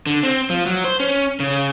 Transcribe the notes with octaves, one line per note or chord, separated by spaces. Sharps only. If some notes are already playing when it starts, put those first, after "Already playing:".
D3
C4
F3
F#3
C5
C#4
C#3